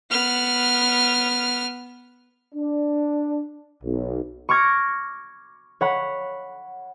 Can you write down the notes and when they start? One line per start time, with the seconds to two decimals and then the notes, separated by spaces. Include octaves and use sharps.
0.10 B3 F6
2.55 D4
3.83 B1
4.49 C#6 D6 F6 G#6 A#6
5.81 C#5 F#5 B5